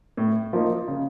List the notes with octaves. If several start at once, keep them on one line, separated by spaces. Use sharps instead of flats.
A2
F3 A#3 D#4
C#3